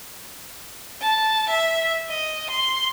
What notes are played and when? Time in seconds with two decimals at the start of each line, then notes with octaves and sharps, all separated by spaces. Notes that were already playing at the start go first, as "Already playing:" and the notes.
1.02 A5
1.50 E5
2.10 D#5
2.50 C6